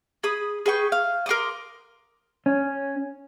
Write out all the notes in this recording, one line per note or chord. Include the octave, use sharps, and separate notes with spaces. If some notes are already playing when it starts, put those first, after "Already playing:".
G#4 B5 D#6
G#4 B4 G5 C#6
F5
A#4 C6 D6 D#6
C#4